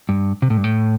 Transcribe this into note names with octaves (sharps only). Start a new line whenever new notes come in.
G2
C3
A2
G2
A2